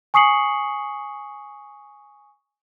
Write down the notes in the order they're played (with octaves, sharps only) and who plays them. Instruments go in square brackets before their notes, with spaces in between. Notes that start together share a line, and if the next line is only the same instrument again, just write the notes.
[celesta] G#5 C#6 D#6 C7 C#7 F#7